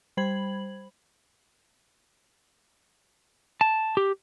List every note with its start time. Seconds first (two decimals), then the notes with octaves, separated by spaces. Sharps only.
0.17 G3 C5 B5 G#6 F#7
3.61 A5
3.97 G4